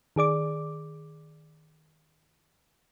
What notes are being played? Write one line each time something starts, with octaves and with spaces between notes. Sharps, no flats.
D#3 G#4 D5 D6